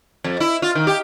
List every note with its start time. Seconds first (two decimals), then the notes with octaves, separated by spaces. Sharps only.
0.24 F2
0.40 E4
0.62 F4
0.75 D#3
0.87 G4